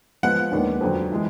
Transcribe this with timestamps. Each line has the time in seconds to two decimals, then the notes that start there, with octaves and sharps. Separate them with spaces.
0.23 F3 G#3 B3 F#5
0.51 D#2 D#3 G#3 B3 D4
0.81 F2 D3 F#3
1.12 E3 G#3